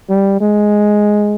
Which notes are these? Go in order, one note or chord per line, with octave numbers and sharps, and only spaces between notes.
G3
G#3